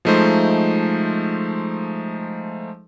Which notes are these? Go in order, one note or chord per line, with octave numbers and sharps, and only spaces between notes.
F3 G#3 A3 D#4 C5